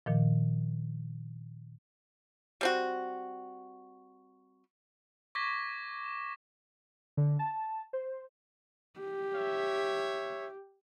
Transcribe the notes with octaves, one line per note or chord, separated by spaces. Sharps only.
A#2 D#3 F3
G3 C4 F#4
C#6 D6 G#6 A#6 B6 G7
E7
D3
A5
C5
G4
C#5 E5